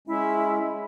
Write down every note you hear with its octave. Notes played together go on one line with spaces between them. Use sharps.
G#3 C#4 E4 E5